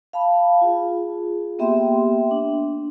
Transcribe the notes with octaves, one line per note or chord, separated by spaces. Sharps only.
F5 A5 B5
F4 G#4
A#3 B3 G4 E5 G5 C6
D4